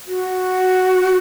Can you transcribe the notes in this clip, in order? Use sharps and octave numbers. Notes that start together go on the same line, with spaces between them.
F#4